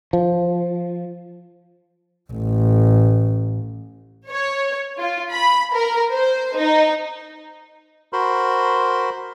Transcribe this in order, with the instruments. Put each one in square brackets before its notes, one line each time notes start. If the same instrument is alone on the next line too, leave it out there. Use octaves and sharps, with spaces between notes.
[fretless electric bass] F3
[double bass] A1
[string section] C#5
F4
B5
A#4
C5
D#4
[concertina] F#4 A#4 C5 B5 C6